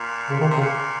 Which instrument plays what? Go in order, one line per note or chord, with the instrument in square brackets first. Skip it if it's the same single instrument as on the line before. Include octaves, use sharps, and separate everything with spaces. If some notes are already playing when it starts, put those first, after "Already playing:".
Already playing: [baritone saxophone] A#2
[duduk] C#3
[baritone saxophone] A#2 [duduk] D#3
[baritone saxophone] C3
[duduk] C#3
[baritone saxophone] A#2